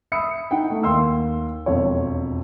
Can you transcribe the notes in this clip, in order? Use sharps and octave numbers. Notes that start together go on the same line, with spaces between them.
E5 B5 D#6 E6 C#7
D#4 F#5 G5
A3
D#2 C6 E6
E1 F2 C#5